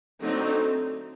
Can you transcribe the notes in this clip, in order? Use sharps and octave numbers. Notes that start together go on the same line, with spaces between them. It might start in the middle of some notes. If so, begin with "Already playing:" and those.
D3 F#3 A3 C4 D#4